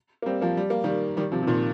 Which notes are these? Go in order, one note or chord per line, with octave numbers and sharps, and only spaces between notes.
A#3
G3 C4
F3 A#3
G3
A#3
D#3 G3
D#3 G3
C3 F3
C3
A#2 D#3